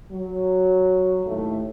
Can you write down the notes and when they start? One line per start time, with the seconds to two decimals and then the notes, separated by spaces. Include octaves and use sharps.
0.11 F#3
1.26 D#2 A2 A3